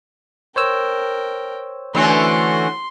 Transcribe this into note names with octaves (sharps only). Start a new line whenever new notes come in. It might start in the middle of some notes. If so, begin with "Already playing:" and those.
A#4 C5 C#5 G5 E6
D3 E3 A3 C#4 F#4 C6